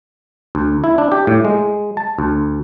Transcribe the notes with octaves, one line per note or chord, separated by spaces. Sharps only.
D2
E4
D4
G4
A2
G#3
A5
D2